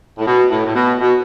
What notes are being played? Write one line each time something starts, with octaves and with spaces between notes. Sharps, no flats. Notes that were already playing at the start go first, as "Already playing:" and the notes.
A2
B2
A2
A2
B2
B2